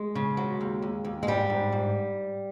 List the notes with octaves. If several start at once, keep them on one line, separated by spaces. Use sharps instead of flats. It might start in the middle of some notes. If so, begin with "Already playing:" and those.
Already playing: G#3
C#3
F#3
D#2
D#2
D#2
G#3
G#2 G3
G#2
G#2